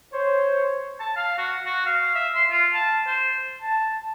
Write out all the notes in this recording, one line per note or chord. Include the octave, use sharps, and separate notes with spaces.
C5 C#5
A5
F5
F#4
F#4
F5
E5
C6
F4
A5
C5
A5